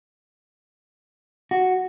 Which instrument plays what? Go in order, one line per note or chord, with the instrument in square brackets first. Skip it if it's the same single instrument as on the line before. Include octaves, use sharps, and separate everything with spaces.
[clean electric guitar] F#4